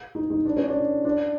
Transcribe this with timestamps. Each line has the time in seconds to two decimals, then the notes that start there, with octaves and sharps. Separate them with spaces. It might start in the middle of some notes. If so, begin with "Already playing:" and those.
0.15 D#4
0.30 D#4
0.45 D4
0.57 C#4
0.69 D4
1.05 D4